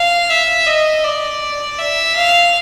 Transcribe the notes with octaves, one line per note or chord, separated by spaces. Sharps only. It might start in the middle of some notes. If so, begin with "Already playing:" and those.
Already playing: F5
E5
D#5
D5
E5
F5